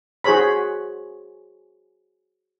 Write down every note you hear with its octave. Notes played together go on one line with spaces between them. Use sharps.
F#4 G#4 C5 C#5 B5